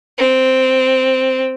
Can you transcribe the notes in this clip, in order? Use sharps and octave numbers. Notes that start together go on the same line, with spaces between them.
C4